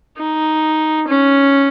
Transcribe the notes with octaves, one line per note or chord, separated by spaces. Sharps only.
D#4
C#4